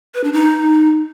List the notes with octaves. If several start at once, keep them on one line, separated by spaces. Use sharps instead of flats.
B4
D4
D#4